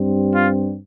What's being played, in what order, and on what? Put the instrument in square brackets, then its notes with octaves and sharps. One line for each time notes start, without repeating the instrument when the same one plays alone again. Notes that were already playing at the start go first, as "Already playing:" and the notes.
Already playing: [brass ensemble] G2 G3 C4
F4